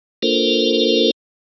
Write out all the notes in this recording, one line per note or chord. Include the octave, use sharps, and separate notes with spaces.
A#3 D4 F4 A4 A#4 C5